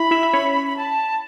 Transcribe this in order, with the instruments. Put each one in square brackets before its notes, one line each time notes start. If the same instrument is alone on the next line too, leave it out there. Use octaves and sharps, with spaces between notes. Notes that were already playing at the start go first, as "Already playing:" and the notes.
Already playing: [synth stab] E4 E5 [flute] B5
[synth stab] E4 E5
E5
C#4 C#5
[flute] B5
A5